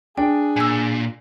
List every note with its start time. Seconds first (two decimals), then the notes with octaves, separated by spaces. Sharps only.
0.18 D4 G#4 G5
0.56 A#2 G#5 E6